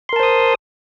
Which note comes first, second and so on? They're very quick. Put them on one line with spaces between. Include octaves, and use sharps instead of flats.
C6 A#4 A5 C5 D#6